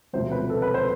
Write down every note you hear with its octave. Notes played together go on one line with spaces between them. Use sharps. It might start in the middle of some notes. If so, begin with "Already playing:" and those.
E1 D2 C3 F3 C5
B4
A4
B4
C5